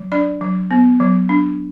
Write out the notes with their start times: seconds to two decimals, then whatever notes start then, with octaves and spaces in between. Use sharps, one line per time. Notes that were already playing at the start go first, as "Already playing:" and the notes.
Already playing: F#3
0.12 D4 D5
0.41 F#3
0.71 B3
1.00 F#3
1.29 D4